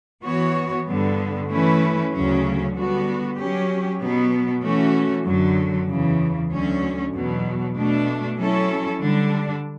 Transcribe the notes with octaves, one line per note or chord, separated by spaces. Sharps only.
E3 B3 F#4 C#5
G2 D3 G3 B3
E3 A3 C#4 E4 B4
D2 C#3 F#3 C#4
D3 G3 B3 F#4
F#3 C#4 G4
B2 F#3 B3
E3 A3 C#4 F#4
F#2 D3 F#3
E2 C#3 E3
D2 D3 F#3 C#4
E2 B2 F#3
B2 A3 D4
F#3 C#4 E4 A4
D3 G3 D4